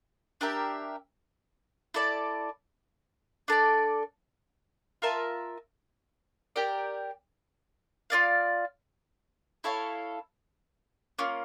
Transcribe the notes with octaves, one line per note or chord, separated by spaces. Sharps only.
D4 G4 A#4 E5
E4 A4 D5 A5
D4 A4 D5
F4 A#4 E5 A5
G4 A#4 D5
F4 A#4 D5 F5
E4 A4 C#5 F5
A#3 C#4 F4